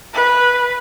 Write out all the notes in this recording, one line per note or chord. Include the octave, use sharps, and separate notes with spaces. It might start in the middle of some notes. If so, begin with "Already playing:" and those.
B4